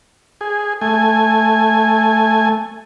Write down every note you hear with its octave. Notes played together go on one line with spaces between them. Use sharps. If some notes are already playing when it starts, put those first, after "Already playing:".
G#4
A3 G#5